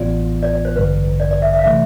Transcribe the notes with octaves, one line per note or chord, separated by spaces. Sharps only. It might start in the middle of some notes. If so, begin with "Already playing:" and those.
Already playing: A1 A2 E3 B3 F4 D5
D5
D5
C5
A1 G2 D3 G3 B4
D5
D5
E5
E5
F5
C3 E3 A3 E5